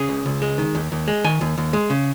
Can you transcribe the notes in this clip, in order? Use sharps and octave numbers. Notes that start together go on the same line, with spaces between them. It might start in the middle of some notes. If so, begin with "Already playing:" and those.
Already playing: C#3 G#4
C#2
C#2
G#3
D#3
D#2
D#2
G#3
D#3 G#5
D#2
D#2
G#3
C#3